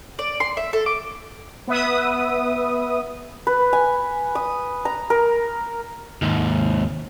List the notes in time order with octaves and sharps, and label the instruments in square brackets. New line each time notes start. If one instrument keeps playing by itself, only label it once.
[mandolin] D5
C6
E5
A4
D6
[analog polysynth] B3 B4 E5 D#6
[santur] B4
G#5
D#6
A#5
A#4
[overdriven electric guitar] D#2 G#2